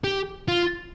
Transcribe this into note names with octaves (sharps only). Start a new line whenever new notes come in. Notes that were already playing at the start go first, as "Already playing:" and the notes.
G4
F4